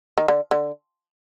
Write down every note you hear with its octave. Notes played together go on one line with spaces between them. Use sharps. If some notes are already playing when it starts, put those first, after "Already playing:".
D#3
D3
D3